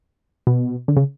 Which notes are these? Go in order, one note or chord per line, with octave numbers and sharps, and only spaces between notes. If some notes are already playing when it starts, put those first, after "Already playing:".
B2
D3
C#3